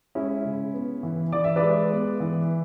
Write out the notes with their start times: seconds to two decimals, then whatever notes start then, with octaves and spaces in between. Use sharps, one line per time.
0.15 G#3 C#4 E4
0.44 C#3
0.74 B3
1.03 E3
1.32 E3 D5
1.44 E5
1.56 B4 D5
1.62 G#3
1.91 B3
2.20 E3